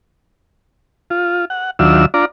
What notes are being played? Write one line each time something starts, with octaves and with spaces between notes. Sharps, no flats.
F4
F#5
D#2 F#3 D4 F4 E5 E6
D4 F4 D5 A#5